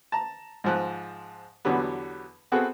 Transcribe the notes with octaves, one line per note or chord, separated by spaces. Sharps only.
A5 A#5
G#2 F3 F#6
E2 D3 F#3 G3 B3
B3 C4 F#4 G#4 A4 B4